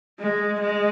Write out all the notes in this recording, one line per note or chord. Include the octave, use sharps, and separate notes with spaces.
G#3
G#3